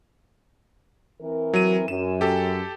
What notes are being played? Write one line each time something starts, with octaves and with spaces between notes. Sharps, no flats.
E3 C4 A#4
F#3 D#7
F#2 E7
G4 A4